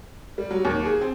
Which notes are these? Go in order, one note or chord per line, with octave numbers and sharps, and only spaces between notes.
G3
F#3
D#2
G#4
C4